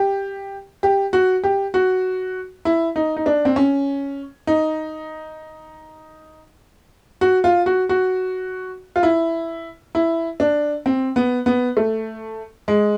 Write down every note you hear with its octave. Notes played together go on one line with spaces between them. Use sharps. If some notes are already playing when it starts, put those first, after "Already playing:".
Already playing: G4
G4
F#4
G4
F#4
E4
D#4
D#4
D4
C4
C#4
D#4
F#4
F4
F#4
F#4
F4
E4
E4
D4
C4
B3
B3
A3
G#3